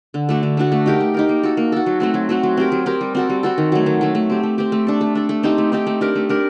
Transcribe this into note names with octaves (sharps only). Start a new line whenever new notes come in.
D3
A3 D4 F#4
D3
A3 D4 F#4
A3
D#4 G4 A#4
A3
D#4 G4 A#4
A#3
F#4 A4
A#3
F#4 A4
F#3
A3 C4 F#4
F#3
A3 C4 F#4
F#3
C4 G4 A#4
F#3
C4 G4 A#4
G3
C4 F#4 A4
G3
C4 F#4 A4
D#3
F#3 A3
D#3
F#3 A3
A3
C4 G4
A3
C4 G4
A3
D4 A4
A3
D4 A4
A3
C4 D#4 G4
A3
C4 D#4 G4
A3
D4 G4 A#4
A3
D4 G4 A#4